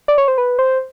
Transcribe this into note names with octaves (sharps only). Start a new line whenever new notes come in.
D5
C#5
C5
B4
C5